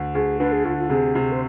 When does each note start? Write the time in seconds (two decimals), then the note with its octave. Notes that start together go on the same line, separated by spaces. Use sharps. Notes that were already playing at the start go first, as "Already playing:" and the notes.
Already playing: D2
0.14 D2 G#4
0.39 D3 B4
0.52 G#4
0.64 D2 F4
0.78 F4
0.89 C3 G#4
1.15 C3
1.32 C5